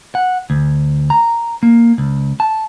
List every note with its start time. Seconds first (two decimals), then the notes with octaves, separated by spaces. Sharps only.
0.15 F#5
0.50 D2
1.10 A#5
1.63 A#3
1.98 C#2
2.40 A5